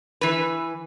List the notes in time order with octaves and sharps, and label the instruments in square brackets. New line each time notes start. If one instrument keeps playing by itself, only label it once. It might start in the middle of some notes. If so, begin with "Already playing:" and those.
[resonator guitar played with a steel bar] E3 B4